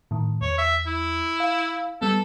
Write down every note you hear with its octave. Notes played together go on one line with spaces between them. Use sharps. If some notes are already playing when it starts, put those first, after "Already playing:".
A2 D#3
E2 C#5
E5
E4
F5
G3 B3 A4